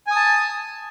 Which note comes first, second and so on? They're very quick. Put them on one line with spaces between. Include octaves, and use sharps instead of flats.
G#5 D#6 A5